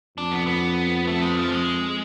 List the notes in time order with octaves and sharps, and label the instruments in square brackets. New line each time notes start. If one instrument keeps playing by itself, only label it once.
[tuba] F2 [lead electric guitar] D4
[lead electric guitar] B3
B3
A3
G#3
F3
G#3